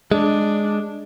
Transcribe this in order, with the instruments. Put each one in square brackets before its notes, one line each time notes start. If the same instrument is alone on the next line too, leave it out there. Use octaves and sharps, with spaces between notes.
[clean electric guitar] G#3 [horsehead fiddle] D4